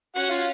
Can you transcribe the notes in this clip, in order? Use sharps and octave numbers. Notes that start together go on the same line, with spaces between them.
C#4 F#4 F#5
F4 F5